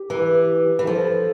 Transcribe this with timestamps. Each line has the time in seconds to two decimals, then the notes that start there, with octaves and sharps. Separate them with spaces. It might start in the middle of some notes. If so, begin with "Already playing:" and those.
Already playing: G4
0.10 E3
0.79 E3
0.87 F3 A4